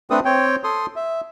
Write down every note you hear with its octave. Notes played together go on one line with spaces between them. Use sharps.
A3 C4 D4 A4 B4 D#6
C4 C#5 G5
A4 C6 D#6
E5